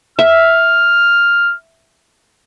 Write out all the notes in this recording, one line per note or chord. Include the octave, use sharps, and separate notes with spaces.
E5 F6